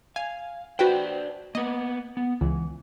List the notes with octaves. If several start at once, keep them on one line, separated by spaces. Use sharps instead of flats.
F5 G#5
D4 F#4 B4 C5 G5
A#3 B3 D#5
B3
C#2 E3